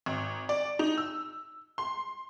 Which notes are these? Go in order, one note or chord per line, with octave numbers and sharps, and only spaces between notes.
G#1
D5
D#4
E6
C6